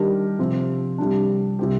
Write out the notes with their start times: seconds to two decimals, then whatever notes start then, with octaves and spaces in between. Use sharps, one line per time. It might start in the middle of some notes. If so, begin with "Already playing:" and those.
Already playing: D#3 G3 D4 G4 A#4
0.39 C3 F3 C4
0.98 C3 G3 D4
1.59 C3 G3 C4 G4